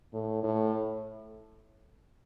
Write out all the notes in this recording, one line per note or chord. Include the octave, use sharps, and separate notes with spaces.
A2
A2